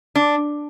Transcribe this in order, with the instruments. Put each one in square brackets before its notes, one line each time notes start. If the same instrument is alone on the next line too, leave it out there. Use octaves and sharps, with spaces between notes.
[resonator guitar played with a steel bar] D4